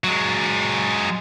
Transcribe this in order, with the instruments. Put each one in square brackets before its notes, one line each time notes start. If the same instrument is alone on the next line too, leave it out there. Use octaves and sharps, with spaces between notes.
[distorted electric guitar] F#3 G#3